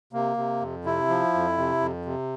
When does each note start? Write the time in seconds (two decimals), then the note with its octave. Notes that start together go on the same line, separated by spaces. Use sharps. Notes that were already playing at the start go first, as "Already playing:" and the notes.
0.13 C3 A#3
0.37 C3
0.61 F2
0.85 C3 E4
1.08 F3
1.34 F2
1.58 C3
1.81 F2
2.05 C3